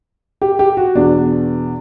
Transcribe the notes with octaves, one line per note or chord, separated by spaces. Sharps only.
G4
G4
F#4
E2 B2 D4